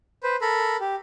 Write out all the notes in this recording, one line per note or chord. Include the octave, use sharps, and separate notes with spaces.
B4 C5
A4 A#4 B5
G4